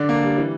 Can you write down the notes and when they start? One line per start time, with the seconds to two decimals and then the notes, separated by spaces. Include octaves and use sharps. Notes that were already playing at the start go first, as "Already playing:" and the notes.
Already playing: D3 D4
0.09 A#3
0.23 G3
0.38 E3